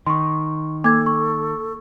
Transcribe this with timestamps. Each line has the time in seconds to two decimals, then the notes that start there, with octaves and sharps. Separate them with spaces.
0.07 D#3 C6 C#6
0.84 A#3 A4 D6 G#6
1.06 C#6